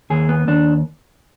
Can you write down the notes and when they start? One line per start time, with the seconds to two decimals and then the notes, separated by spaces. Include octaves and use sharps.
0.10 D#2 G#4
0.29 B3
0.48 D#2 D4